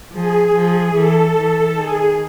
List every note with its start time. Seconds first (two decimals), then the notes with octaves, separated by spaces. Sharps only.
0.12 F3 G#4
0.55 F3
0.95 E3 A4
1.37 E3
1.77 D#3 G#4